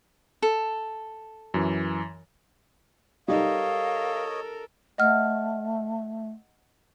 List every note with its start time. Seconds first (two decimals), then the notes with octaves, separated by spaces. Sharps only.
0.42 A4
1.54 F#2 E3
3.28 G3 D#4 A4 A#4 C#5 D#5 F5
4.98 A3 D#5 F#5 F6